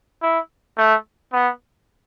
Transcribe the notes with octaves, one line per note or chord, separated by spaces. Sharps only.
E4
A3
B3